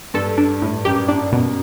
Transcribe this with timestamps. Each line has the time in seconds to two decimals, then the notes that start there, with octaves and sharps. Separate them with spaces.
0.14 G2 A4
0.38 D4
0.62 A2
0.85 F#2 G4
1.08 G2 D4
1.31 F#2 B2